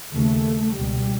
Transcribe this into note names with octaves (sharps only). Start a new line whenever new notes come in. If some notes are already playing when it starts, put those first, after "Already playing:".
D#2 C#3 A3
C#2 B2 G3